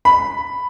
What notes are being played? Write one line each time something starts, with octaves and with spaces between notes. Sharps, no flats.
B5